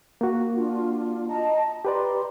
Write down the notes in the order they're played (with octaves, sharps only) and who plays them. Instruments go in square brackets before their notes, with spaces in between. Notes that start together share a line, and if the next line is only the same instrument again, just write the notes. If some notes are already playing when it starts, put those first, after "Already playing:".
[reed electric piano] A#3 F#4
[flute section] D4 F4
D#5 A5 A#5
[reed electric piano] G4 B4 D5 [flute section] A#5 C6